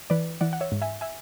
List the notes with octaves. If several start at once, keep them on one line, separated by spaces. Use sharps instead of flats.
E3 B4 D5
E3 D5 F#5
F#5
C#5 E5
G#2
E5 G#5
E5 G#5